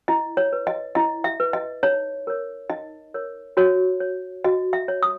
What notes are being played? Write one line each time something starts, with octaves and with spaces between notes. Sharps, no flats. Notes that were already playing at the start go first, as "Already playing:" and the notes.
E4 D#5
C#5
B4
D#5
E4 D#5
E5
B4
D#5
D#4 C#5
A#4 C#5
D#4 D#5
A#4 C#5
F#4 C#5
C#5
F#4 D#5
E5
C#5
D#6